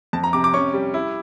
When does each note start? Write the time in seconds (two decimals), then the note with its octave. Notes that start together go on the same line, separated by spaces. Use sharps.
0.13 F2 A5
0.24 A#5
0.33 C3 D6
0.44 D6
0.54 C#4 C#6
0.74 G3
0.94 E4